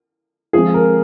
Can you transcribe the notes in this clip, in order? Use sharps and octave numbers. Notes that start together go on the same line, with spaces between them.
F3 G#3 C4 G#4
A#4